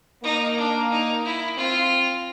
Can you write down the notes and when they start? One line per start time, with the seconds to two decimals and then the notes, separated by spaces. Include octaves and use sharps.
0.24 A#3 D#4
0.58 D4
0.91 D#4
1.25 E4
1.58 C4 F4